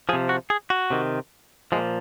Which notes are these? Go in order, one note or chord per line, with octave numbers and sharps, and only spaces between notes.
C3 F3 G#4
F#4
G#4
F#4
C3 D#3
A#2 F3 G#3